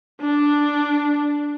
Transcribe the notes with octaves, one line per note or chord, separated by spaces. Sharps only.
D4